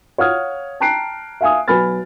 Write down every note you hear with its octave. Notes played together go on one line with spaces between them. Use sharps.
C#5 F5 F#5 D#6 F6 G#6
G5 A5 A#5 F#6 C7 D7
E5 F5 G#5 D#6
B1 B4 G#5 B5 F6 A6